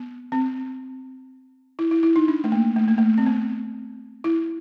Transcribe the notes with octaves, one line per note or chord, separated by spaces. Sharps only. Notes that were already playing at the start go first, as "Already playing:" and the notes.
Already playing: B3
C4
E4
E4
E4
D#4
D4
A3
A#3
A3
A#3
A3
C4
B3
E4